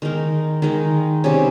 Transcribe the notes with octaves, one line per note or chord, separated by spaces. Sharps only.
D#3 G#3 D#4 A#4
D#3 G#3 D#4
C3 G3 C#4 G#4